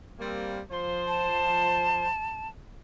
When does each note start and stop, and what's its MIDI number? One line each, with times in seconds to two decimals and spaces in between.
0.19 0.60 55
0.19 0.60 58
0.19 0.60 60
0.71 2.07 53
0.71 2.07 72
1.08 2.48 81